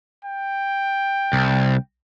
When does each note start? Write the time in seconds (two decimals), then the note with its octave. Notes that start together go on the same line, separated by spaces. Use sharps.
0.25 G5
1.33 C2